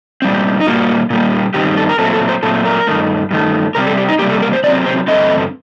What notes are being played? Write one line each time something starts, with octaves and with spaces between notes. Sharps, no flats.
A#2 G3 C4
D#4
A#2 G3 A#3 F#4
A#2 G3 A#3
G2 D#3 G3 C4 G4
A4
A#4
A#2 F#3 A3 C4 A4
A4
C5
A#2 F#3 A3 C4 A4
A#4
G2 D#3 A3
G2 D#3 A3
C3 G3 C4 A#4
A4
G4
D#4
C3 G3 A#3 G4
A4
A#4
C5
C3 F#3 C4 D5
C5
G2 D3 A3 C4 D#5